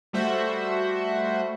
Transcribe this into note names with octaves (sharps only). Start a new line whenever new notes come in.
G3 A3 F#4 C5 E5 F#5